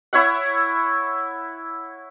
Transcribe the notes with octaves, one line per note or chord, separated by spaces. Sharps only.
E4 C#5 E5 F#5